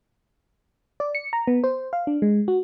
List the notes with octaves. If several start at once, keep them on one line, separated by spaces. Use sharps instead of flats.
D5
C#7
A#5
B3
C5
F5
D4
G#3
F#4